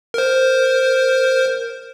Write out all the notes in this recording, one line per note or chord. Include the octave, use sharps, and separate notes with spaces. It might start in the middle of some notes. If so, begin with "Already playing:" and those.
A#4 C5